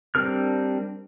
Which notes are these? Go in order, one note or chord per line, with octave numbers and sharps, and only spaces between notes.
G3 C4 D4 A#4 F6